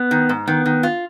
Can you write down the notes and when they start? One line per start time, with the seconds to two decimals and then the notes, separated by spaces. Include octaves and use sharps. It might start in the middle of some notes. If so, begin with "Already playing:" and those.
Already playing: B3
0.11 D#3
0.29 G#2
0.47 D#3 B3
0.66 D#3
0.83 F4